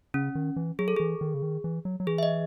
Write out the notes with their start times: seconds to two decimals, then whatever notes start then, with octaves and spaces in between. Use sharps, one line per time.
0.14 C#3 C#4
0.35 D#3
0.56 E3
0.79 F#3 G#4
0.88 A4
0.96 E3 G#4
1.21 D#3
1.34 C#3
1.43 D#3
1.64 E3
1.85 F#3
2.00 F#3
2.07 E3 G#4
2.18 E5
2.23 D#5